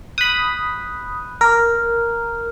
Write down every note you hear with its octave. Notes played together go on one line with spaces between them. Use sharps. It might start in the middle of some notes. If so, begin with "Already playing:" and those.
B5 D#6 F#6 G6
A#4 D6 F6